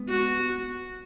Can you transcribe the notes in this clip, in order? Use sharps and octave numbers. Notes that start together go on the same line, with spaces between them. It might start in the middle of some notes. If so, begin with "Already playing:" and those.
Already playing: G#3 B3
F#4